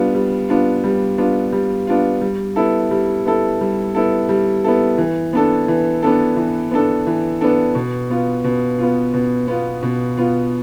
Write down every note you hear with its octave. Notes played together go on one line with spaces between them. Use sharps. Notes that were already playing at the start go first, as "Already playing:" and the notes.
Already playing: G3 B3 D4 F4
G3
B3 D4 F4
G3
B3 D4 F4
G3
B3 D4 F4
G3
B3 E4 A4
G3
B3 E4 A4
G3
B3 E4 A4
G3
B3 E4 A4
E3
B3 D4 A4
E3
B3 D4 A4
E3
B3 D4 A4
E3
B3 D4 A4
B2
B3 F4
B2
B3 F4
B2
B3 F4
B2
B3 F4